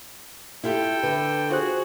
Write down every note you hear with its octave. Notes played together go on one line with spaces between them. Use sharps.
E4 F4 G4 A4 G5
D3 B4
F4 F#4 G#4 C5 F#6